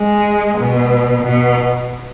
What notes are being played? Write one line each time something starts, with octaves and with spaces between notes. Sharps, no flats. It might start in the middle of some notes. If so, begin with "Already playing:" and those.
Already playing: G#3
B2
B2